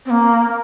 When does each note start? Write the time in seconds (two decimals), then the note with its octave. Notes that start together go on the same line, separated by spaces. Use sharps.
0.06 C4
0.10 A#3